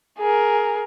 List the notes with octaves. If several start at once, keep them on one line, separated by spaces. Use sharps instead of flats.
G#4 A#4